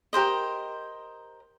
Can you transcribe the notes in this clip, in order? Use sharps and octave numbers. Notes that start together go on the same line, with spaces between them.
G4 A#4 C5 D#5